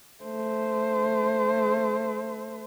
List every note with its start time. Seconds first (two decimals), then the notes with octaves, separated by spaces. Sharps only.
0.24 A3 C5